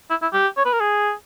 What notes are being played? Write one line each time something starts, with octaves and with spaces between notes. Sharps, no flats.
E4
E4
G4
C#5
B4
A#4
G#4